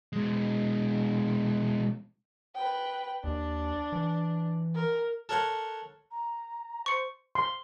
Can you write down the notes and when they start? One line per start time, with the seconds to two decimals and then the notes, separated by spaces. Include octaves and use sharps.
0.13 B2 G#3
2.55 B4 G5
3.24 D#2 D4
3.92 E3
4.75 A#4
5.29 A4 A#4 C#5 F#5 C6
6.11 A#5
6.86 C5 C#6 C#7
7.35 C6